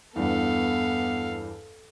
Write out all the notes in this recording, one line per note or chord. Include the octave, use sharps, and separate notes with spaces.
E2 G2 B3 A4 F5